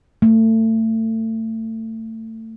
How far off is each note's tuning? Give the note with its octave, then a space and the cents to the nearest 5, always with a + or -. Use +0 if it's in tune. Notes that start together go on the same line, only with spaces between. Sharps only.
A3 +25